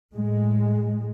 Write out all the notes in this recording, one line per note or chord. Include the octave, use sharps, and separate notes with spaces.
A2 G#3